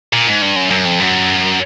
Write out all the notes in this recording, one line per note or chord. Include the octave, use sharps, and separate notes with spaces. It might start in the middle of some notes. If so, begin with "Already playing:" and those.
A#2
G#2
G2
F#2
F#2
F2
F#2